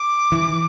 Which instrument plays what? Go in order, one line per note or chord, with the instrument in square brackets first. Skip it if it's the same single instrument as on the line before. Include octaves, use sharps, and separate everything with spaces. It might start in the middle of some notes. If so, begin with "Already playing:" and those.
Already playing: [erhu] D6
[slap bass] E3